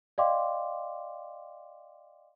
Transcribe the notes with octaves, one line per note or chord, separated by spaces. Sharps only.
D5 D#5 F5 G5 C6 D6